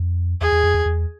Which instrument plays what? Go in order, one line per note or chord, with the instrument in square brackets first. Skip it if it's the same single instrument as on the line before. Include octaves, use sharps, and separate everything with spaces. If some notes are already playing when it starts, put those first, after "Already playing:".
Already playing: [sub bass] F2
[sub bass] E2 [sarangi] G#4
[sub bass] E2
F2
E2
E2